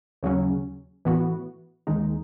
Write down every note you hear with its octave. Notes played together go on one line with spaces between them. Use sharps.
D#2 C#3 F#3 C#4
A2 E3 B3 F#4
D#2 D#3 G#3 D#4